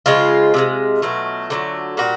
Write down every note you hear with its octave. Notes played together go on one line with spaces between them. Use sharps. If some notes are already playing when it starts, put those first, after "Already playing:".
C#3 F3 G#3 F4
C3 F3 G#3
B2 F#3 A3
D3 F#3 A3
A#2 G3 F#4